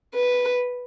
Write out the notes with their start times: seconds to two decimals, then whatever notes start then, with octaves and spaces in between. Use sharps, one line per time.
0.15 B4